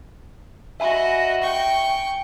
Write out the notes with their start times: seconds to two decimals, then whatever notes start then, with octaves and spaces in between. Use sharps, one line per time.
0.80 F#4 D#5 E5 G#5 B5
1.41 G5 C#6